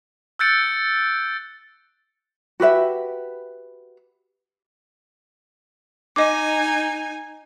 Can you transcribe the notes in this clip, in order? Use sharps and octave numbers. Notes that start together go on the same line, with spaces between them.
E6 F#6 G6 A6 C#7 D7
F#4 G4 B4 E5
D#4 D#5 G#5 D6